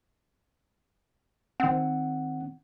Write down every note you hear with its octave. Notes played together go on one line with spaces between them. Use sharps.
D#3 C4 F#5